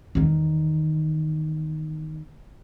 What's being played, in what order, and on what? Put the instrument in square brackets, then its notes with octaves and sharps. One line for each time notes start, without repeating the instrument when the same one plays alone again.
[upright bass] E2 D#3